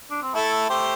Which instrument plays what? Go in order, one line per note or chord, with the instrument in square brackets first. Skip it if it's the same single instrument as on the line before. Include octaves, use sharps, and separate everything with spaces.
[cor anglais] D4
C4
[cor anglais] A3 [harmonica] E4 A4
[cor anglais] A3 [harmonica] G4 C5